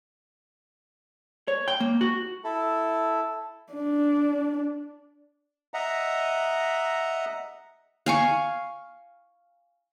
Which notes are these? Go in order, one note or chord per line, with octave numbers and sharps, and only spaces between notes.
C#5
G5
A#3
F#4
E4 A4
D4
D#5 E5 F#5 A#5
F5 G#5 C#6